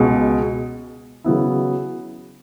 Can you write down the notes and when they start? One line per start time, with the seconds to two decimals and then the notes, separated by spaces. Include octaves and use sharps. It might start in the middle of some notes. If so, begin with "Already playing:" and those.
Already playing: C#2 B2 G#3
1.24 C#3 F#3 B3 E4